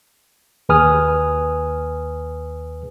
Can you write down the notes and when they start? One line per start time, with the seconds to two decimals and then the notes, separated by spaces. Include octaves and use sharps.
0.69 D#2 G#4 B4 G#5 D#6 F6